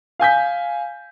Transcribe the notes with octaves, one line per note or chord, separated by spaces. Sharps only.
F5 G#5 G6 B6